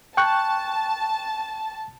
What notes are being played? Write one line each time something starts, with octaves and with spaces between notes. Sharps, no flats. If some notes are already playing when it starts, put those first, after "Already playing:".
G5 A5 C#6 F#6